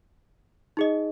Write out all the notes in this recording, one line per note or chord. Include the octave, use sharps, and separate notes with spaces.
D#4 G#4 D#5